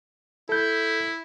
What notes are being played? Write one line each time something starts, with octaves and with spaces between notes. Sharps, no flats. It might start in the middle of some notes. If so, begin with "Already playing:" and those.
E4 A4 G6